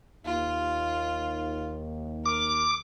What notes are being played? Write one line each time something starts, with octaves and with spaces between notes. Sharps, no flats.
D#2 F4
A#4 D6